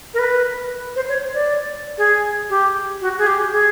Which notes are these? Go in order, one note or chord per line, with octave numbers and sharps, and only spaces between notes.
A#4
B4
C5
C#5
D5
G#4
G4
F#4
G#4
G4
G#4